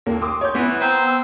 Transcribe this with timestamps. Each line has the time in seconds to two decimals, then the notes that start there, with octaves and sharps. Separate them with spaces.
0.06 D#2 A#3
0.22 C6 D6 D#6
0.41 C#5 G6
0.55 E3 B3
0.81 C4 A#5
1.06 E6